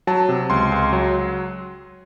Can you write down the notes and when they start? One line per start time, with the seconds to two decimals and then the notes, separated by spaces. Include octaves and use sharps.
0.07 F#3 A5
0.29 C3
0.50 C#2 C6
0.72 C#2
0.93 F#3